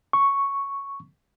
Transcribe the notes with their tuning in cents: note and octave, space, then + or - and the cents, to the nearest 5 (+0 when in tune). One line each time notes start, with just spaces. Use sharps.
C#6 +0